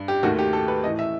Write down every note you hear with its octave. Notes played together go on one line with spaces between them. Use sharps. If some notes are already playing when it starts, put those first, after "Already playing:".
Already playing: G2
G4
D#2 D#3 A3 F#4
G4
A4
B4
A2 E3 A3 D#5
E5